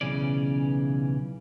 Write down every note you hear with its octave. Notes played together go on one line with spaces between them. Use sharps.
B1 C#3 E3 C#4 D5